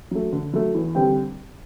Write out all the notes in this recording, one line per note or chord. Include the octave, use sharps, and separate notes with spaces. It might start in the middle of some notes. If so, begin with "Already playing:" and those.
F#3 A3
D3
F#3 A3
E2
D3 G3 C4 G4